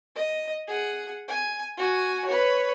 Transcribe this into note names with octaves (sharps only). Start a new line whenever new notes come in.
D#5
G#4 F#5
G#5
F#4 G#5
B4 C#5